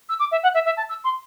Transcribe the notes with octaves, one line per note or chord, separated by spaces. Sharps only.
E6
D6
E5
F#5
E5
E5
A5
E6
C6